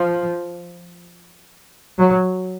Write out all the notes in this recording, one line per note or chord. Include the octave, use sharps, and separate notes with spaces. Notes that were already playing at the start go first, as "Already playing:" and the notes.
Already playing: F3
F#3